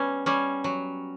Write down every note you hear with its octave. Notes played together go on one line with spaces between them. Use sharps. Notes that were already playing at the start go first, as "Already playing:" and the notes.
Already playing: G3 B3 C#4
G3 C#4
F#3